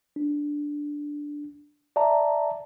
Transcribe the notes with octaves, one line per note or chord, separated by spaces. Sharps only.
D4
D5 E5 A5 A#5